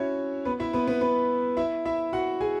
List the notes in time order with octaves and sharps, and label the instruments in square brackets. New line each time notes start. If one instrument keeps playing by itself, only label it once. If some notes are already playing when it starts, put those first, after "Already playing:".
Already playing: [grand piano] C#4 E4 F#4 C#5 E5
B3 B4
E4 E5
B3 B4
B3 B4
B3 B4
E4 E5
E4 E5
F#4 F#5
G#4 G#5